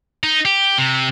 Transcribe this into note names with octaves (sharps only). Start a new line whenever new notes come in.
D#4
G4
C3